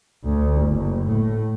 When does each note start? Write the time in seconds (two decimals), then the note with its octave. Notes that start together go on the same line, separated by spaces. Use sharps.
0.24 D2
0.62 F#1
1.06 A2